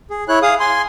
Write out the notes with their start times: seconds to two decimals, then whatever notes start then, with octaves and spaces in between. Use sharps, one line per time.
0.10 G#4
0.28 E4 C#5 F#6
0.42 G#4 F5 D#6
0.60 G#5 C6